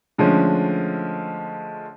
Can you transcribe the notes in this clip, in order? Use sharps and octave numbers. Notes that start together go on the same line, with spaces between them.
D3 F3 G#3 A3 C#4